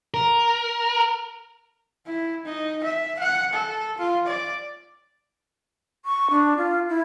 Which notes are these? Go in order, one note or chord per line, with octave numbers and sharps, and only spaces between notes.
A#4
E4
D#4
E5
F#5
A4
F4
D5
C#6
D4
F4
E4